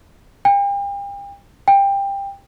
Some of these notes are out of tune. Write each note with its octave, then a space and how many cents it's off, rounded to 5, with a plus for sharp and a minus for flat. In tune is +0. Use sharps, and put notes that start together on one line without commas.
G5 +40
G5 +20